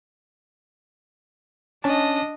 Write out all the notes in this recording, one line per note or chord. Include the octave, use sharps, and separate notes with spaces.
C#4 D4 D#5 A5